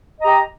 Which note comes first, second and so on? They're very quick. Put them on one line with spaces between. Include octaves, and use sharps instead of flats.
D#5 A#5 G4